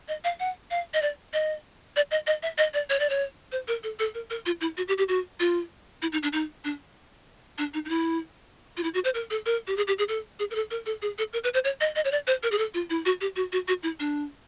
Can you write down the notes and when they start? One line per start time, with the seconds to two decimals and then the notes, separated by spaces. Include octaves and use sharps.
0.08 D#5
0.24 F5
0.40 F#5
0.71 F5
0.94 D#5
1.02 D5
1.33 D#5
1.96 D5
2.11 D#5
2.27 D#5
2.43 E5
2.58 D#5
2.74 D5
2.90 C#5
2.99 D5
3.09 C#5
3.52 C5
3.68 A#4
3.83 A4
3.99 A4
4.14 A#4
4.30 A#4
4.46 F4
4.61 E4
4.77 F#4
4.88 G4
4.98 G4
5.09 F#4
5.40 F4
6.02 E4
6.12 D#4
6.23 D4
6.33 D#4
6.64 D4
7.58 D4
7.74 D#4
7.85 D#4
7.89 E4
8.77 F4
8.83 E4
8.94 F#4
9.04 C5
9.14 A#4
9.30 A4
9.46 A#4
9.67 G4
9.77 G#4
9.87 G4
9.99 G#4
10.08 A4
10.39 G#4
10.51 A#4
10.55 A4
10.71 A#4
10.86 A4
11.02 G#4
11.18 A4
11.33 A#4
11.44 B4
11.54 C5
11.64 C#5
11.81 D#5
11.96 D#5
12.05 C#5
12.11 D5
12.27 C5
12.43 A#4
12.52 G#4
12.58 A4
12.74 F4
12.90 E4
13.06 F#4
13.21 G4
13.36 F#4
13.52 F#4
13.68 F#4
13.83 E4
14.00 D4